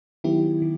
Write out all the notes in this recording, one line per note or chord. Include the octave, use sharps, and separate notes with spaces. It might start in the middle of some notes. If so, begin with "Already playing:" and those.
D#3 F#3 B3 E4 G4
D#3